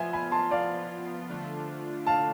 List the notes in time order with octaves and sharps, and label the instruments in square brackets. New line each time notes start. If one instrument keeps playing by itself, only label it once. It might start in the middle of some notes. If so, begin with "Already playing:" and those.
Already playing: [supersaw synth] F3 B3 F4 [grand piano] E5 G#5
[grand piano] G#5 B5
A5 C6
D5 F5
[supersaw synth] D3 F3 A3 D4 F4
[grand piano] F5 A5